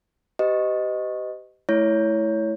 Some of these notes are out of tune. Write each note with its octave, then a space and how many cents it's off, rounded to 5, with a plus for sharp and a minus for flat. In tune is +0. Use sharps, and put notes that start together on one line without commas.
G4 -20 B4 +45 D#5 +0
A3 -25 E4 +0 C#5 +10